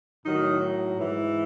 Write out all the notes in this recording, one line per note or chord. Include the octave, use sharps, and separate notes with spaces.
A2 D#3 F#3 D#4
G#2 E3